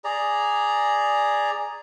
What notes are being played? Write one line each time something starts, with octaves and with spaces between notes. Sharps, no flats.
G#4 D5 A#5